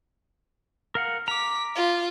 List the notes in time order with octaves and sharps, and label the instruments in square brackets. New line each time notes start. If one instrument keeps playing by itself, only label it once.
[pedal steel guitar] A#4 F5 F#5
[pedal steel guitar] A#5 D6 [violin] B6
[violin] F4